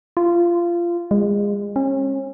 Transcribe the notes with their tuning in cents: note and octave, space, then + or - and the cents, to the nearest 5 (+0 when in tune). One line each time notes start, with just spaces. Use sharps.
F4 -20
G#3 -30
C#4 -35